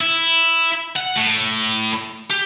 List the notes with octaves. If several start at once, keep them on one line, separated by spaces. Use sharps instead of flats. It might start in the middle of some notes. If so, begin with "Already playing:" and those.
E4
F#5
A2
G4